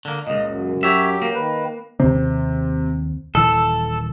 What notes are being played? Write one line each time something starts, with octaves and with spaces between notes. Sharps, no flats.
D3 A#3
C#2 A#2 D#5
F#2
F#3 G4 C#5 E5
A#3
D#3 B4
D#2 C3 C4
D#1 E3 A4 E6